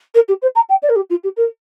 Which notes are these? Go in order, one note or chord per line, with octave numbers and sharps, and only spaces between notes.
A#4
G4
C5
A#5
G5
D5
A#4
G4
F4
G4
A#4